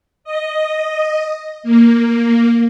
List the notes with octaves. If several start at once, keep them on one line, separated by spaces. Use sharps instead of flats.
D#5
A#3